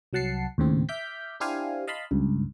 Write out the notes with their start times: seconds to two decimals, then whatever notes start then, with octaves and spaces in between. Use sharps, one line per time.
0.13 C2 F#3 F#5 A5 C7 C#7
0.58 D#2 A2 C#3 C4
0.89 E5 D6 F6 G6 B6
1.40 D4 E4 G4 C5 F5 G#5
1.88 D#5 F5 A5 B5 C6
2.11 C#2 G2